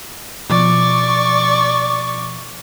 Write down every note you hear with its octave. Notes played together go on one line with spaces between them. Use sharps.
B2 F3 D5 C#6